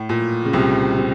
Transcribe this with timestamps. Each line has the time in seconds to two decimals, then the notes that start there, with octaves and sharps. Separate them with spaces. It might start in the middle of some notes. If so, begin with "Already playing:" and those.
Already playing: A2
0.09 A#2
0.45 C#3
0.53 C2 C3
0.99 C3